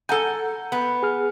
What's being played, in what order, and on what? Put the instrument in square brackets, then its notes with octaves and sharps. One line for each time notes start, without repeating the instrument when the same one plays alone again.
[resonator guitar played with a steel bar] A4 G#5 [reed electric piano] F#5 A#5 G6
[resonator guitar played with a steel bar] B3
[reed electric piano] G#4 F6